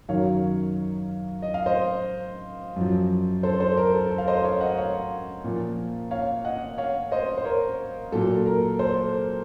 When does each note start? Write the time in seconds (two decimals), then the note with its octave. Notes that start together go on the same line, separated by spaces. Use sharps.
0.09 F#2 D#3 F#3 C#5 F5
1.42 D#5
1.54 F5
1.66 C5 D#5
2.76 F#2 F3
3.43 A4 C5
3.60 A4 C5
3.77 A#4
3.94 A4
4.10 A4
4.18 F5
4.28 C5 D#5
4.44 C#5 F5
4.61 D#5 F#5
4.78 C#5 F5
5.44 A#2 F3
6.11 C#5 F5
6.45 D#5 F#5
6.78 C#5 F5
7.12 C5 D#5
7.38 C5
7.45 A#4 C#5
8.12 A#2 F#3 A4
8.46 A#4
8.79 A4 C5